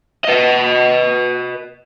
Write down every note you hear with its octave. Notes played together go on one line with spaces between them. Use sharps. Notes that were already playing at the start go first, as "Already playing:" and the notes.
B4 D#5